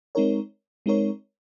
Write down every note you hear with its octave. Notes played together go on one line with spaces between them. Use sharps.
G#3 C4 D#4 A#4 C#5
G#3 C4 D#4 A#4 C#5